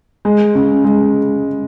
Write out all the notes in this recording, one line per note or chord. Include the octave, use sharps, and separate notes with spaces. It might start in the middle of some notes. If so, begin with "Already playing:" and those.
G#3
C#3
G#3